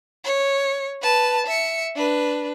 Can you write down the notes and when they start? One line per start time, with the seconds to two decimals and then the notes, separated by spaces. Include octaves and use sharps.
0.24 C#5
1.02 B4 A5
1.47 E5 C#7
1.96 D4 B4